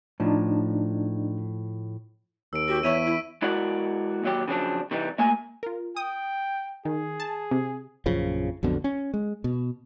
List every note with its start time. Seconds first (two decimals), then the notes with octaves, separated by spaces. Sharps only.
0.20 A2 F3 D4 D#4
2.53 D#2 E6 D7
2.68 F#4 G4
2.83 E2 C#5 E5 C#6 B6 D#7
3.05 E4
3.42 G#3 E4 F#4 A#4 D5 F#5
4.23 D#2 F#3 G4
4.48 C#3 F3 F#3 C4 D4
4.91 C3 E3 G3 D#4
5.19 A3 A#3 G#5
5.63 F4 A#4
5.97 G5 D#6
6.85 D#3 G#4
7.20 A5
7.51 C3
8.06 A#1 F#2 C#3 F3
8.63 B1 F2 B2 D3
8.84 C#4
9.14 G#3
9.44 B2